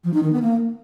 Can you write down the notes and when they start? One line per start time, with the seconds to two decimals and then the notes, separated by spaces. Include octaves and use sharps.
0.04 F3
0.14 D#4
0.23 D#3
0.33 B3
0.42 A#3